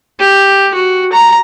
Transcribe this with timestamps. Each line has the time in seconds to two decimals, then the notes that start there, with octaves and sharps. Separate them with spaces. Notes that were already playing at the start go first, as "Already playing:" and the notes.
0.19 G4
0.74 F#4
1.13 A#5